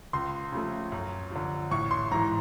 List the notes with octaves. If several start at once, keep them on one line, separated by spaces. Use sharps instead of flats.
C#2 C6
C#3 F3 A3
F#2
D3 F3
A1 C#6
C6
G#2 E3 A#5